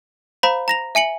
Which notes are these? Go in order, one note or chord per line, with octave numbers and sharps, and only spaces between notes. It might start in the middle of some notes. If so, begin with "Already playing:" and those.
C5 F5 A#5 B5
A#5 A#6 F7
E5 G#5 C#7 F#7